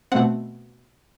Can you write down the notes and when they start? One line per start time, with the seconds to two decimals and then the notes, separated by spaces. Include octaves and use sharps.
0.12 B2 A3 C4 F#5